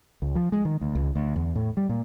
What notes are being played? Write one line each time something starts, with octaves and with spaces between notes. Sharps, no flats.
C#2
F3
G#3
D#3
D2
C#2
D2
E2
A2
G3
A#2